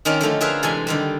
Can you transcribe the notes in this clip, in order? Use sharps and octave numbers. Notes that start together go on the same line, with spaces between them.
D#3 C4 C#4 D#4 A#4 D5
D3 F3 A3 C#4
F4 G#4 A#4 B4 E5 F5
C3 E3 G#3 A4 G#5 C6
D3 D#3 G3